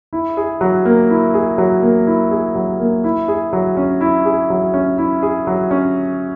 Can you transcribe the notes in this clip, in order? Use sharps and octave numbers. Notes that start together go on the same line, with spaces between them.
E4
G#4
F#3
A#3
E4
G#4
F#3
A#3
E4
G#4
F#3
A#3
E4
G#4
F#3
C#4
E4
G#4
F#3
C#4
E4
G#4
F#3
C#4